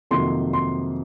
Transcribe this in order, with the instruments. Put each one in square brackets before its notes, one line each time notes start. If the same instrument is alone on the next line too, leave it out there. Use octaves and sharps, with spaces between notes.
[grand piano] F2 C3 D#3 F#3 A#3 C6
C6